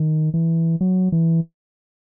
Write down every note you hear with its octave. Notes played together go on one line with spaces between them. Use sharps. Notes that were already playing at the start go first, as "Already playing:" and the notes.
Already playing: D#3
E3
F#3
E3